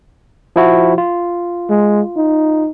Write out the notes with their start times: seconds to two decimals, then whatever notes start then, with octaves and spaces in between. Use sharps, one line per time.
0.56 F3 E4 F#4
0.98 F4
1.69 G#3
2.17 D#4